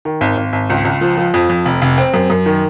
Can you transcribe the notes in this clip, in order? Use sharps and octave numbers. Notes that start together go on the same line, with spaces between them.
D#3
G#1
G#1
G#1
C#2
C#2
F3
F3
F2
F2
F1
F1
C4
F#2
F#2
D#3